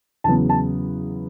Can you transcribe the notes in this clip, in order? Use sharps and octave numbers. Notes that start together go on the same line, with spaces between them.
E2 C#3 F#3 B3 A5
A5